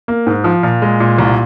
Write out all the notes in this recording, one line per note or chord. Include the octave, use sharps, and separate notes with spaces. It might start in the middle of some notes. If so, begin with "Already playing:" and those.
A#3
G#2
F3
A#2
G#3
A#2
C2